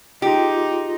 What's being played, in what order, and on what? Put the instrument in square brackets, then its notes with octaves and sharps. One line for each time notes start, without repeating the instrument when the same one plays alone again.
[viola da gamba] D#4 [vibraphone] F4 G#4 C6 [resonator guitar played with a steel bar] G4